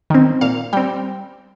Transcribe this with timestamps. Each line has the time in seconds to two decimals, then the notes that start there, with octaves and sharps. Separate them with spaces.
0.10 D#3 C4
0.41 A#2 F5
0.73 G3 C4 G5